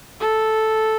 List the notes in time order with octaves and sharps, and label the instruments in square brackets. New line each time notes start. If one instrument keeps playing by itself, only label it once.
[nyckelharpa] A4